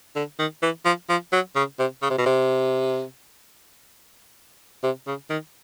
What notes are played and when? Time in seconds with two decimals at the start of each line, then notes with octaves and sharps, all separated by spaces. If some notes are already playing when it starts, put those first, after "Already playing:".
0.16 D3
0.39 D#3
0.63 E3
0.85 F3
1.09 F3
1.33 F#3
1.56 C#3
1.79 C3
2.02 C#3
2.10 C3
2.18 B2
2.26 C3
4.83 C3
5.07 C#3
5.30 D#3